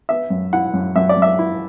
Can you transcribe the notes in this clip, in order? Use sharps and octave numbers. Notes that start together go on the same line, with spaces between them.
B3 E5
F#2
E4 F#5
F#2
F#2 E5
D5
F#2
E5
E4